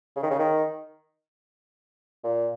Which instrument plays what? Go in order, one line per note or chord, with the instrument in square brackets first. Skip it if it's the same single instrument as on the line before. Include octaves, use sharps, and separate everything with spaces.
[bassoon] C#3
D#3
C#3
D#3
A#2